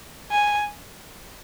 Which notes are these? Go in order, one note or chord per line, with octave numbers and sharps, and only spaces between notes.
G#5